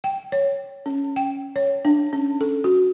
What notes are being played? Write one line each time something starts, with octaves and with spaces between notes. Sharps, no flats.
G5
C#5
C#4
G5
C#5
D4
C#4
A4
F#4